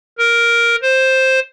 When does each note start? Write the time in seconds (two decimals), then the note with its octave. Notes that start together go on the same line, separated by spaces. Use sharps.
0.18 A#4
0.82 C5